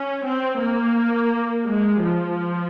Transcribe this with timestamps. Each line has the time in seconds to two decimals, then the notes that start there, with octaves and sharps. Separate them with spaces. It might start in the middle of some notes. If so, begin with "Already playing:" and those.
Already playing: C#4
0.25 C4
0.60 A#3
1.66 G#3
2.02 F3